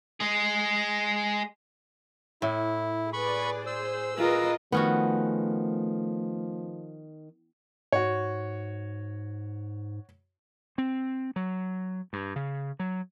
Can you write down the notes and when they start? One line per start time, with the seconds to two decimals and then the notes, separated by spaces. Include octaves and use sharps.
0.20 G#3 G#4
2.42 A2 E4
3.13 G#4 B4 D5 B5 C#6
3.67 G#4 C5 E6
4.17 F4 G#4 A#4 B4 D#5
4.72 D#3 F3 A3 B3 C#4 F#4
7.92 G#2 F#4 C#5
10.78 C4
11.36 F#3
12.13 G2
12.36 C#3
12.79 F#3